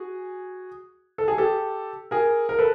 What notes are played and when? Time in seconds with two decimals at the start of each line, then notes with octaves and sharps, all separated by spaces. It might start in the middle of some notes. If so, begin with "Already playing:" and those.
Already playing: F#4 G#4
1.18 A4
1.28 G#4
1.38 G4 A4
2.11 G#4 A#4
2.49 A#4
2.59 A4 B4